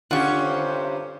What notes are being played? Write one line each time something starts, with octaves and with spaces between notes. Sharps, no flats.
D3 C#4 F4 G4 F#5 C#6
G2 C3 C5